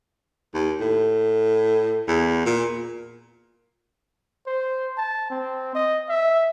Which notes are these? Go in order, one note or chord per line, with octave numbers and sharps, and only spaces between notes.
D#2
A2
E2
A#2
C5
A5
C4
D#5
E5